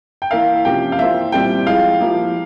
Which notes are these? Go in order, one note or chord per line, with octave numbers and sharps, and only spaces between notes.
G5
E3 A#3 E4 A#4 E5 F5
C3 F3 A#3 C#4 G4 G5
F5
E3 A#3 F4 C5 E5
A#2 G3 C4 E4 G5
F3 G#3 E4 F5
F3 A#3 E4 G4